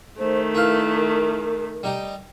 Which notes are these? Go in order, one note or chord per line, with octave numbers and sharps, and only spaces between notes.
D#3 A3 C5
E4 A#4 B4 F5
G3 D#4 G4